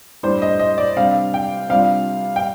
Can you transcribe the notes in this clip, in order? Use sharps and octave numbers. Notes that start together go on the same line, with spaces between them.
A2 G3 D4 C5
D#5
D#5
D5
C3 G3 D4 F5
G5
C3 G3 D4 F4 F5
G5